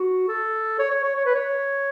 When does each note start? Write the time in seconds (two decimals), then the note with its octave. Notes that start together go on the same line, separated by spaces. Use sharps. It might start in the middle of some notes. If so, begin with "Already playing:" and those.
Already playing: F#4
0.28 A4
0.79 C#5
0.91 C#5
1.03 C#5
1.16 C#5
1.26 B4
1.35 C#5